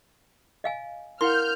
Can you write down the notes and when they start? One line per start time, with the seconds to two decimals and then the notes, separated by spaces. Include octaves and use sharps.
0.64 D#5 F5 G#5
1.21 E4 A#4 F5 F#5 C6 F6 G6